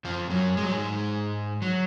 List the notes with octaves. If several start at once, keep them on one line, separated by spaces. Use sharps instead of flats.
F2 F3
F#2 F#3
G#3
F#3
G#2 G#3
F#3